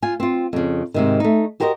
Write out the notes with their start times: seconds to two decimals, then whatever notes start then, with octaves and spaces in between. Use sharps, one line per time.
0.02 F4 G#5
0.20 C4 F4
0.53 F2 C#3
0.94 G#2 C3 D#3
1.20 A3 D#4
1.60 F#4 G4 A#4 C5 D5 D#5